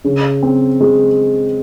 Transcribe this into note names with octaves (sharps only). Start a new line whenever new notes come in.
C#3
C4
G#3